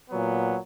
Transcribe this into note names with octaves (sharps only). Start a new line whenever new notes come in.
A#2 F#3 B3